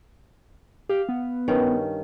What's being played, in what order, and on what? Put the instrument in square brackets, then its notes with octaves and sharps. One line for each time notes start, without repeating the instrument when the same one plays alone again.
[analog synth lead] G4 [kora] F5
[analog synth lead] B3
[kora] G2 D#3 C#4